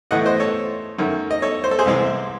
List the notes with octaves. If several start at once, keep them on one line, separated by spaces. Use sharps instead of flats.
A2 E3 A3 D#5 F#5
C5 D#5
A4 C#5
F#2 D#3 A3 C#4
D#5
A4 C#5
C5
A4
G#4 C5
C2 C3 E3 G#3 C4